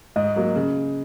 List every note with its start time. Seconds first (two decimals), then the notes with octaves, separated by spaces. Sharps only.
0.16 G#2 D#5
0.36 F#3 A#3
0.56 C#3